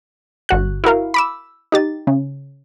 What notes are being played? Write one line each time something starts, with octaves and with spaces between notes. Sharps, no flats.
G1 F#4 F#6
E4 F#4 A#4 F5
B5 D6 E6
D#4 G4 A6
C#3